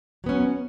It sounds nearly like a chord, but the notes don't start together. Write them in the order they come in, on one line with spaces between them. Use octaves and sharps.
F#3 B3 C#4